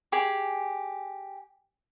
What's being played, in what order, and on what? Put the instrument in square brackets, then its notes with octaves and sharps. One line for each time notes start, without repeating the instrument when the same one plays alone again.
[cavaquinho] G4 G#4